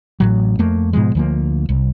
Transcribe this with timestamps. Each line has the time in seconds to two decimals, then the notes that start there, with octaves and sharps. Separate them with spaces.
0.20 A1 A2 F#3
0.59 F2 A3 A#3
0.93 G#2 B2 F3 G#3
1.15 D2 F3 A#3
1.69 C2